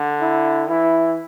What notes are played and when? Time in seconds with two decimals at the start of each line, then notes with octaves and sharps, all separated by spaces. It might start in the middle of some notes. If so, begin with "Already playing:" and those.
Already playing: D3
0.21 E4
0.69 E3 E4